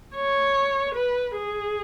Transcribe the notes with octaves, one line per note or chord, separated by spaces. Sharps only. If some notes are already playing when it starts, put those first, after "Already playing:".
C#5
B4
G#4